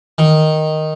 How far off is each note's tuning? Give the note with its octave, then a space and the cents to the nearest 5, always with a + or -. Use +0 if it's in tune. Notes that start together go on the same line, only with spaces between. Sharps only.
D#3 -5